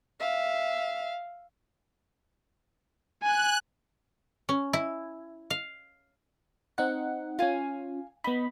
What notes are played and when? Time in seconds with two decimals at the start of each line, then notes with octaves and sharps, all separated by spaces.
0.20 E5 F5
3.23 G#5 F#6
4.49 C#4
4.73 E4
5.50 F5
6.78 C4 D#4 F#5 F#6
7.39 C#4 F4 F5 G#5
8.24 B3 D#4 B5